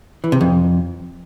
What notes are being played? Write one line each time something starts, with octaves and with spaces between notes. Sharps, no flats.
E3
C3
F2